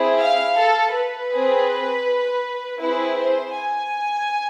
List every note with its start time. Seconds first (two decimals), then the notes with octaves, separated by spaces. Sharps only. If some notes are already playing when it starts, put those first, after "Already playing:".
Already playing: C4 E4 G#4
0.21 F5
0.58 A4
0.95 B4
1.32 C4 G#4
2.80 C4 E4 G#4 B4
3.18 C5
3.54 G#5